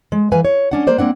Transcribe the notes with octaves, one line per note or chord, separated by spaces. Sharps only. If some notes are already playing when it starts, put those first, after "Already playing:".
G#3
E3 B4 F5 G#5
C#5
C#4 D4 F#5
A#3 C5 D5
A#3 C4 D4 F#5